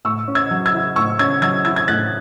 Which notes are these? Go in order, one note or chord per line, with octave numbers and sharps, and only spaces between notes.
A2 C#6 E6
C#4
E6 G#6
F#3
E6 G#6
E4
A2 C#6 E6
C#4 E6 G#6
F#3 E6 G#6
E4 E6 G#6
G#6
A2 F#6 A6